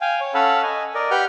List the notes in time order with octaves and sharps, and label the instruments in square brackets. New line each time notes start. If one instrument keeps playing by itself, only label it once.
[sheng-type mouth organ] F5 G5 G#5
C#5
C#4 A4 F5 F#5 A5 B5
D#5 G#5
A#4 D5 D#5
G4 B4 F#5 G5 F6 G6